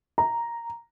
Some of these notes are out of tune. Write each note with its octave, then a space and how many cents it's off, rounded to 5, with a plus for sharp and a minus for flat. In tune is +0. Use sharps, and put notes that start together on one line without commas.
A#5 +0